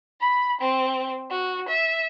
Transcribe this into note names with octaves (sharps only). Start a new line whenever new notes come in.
B5
C4
F#4
E5